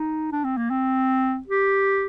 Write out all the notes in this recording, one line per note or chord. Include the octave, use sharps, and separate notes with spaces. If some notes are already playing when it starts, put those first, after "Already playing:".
Already playing: D#4
D4
C4
A#3
C4
G4